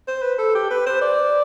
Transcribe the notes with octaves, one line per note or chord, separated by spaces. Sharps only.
C5
B4
A4
G4
B4
C5
D5